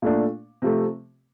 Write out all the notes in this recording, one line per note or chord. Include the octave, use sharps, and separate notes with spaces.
A#2 A3 D4
C3 F3 A3